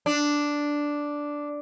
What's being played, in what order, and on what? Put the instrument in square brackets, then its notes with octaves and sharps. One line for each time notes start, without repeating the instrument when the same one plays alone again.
[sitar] D4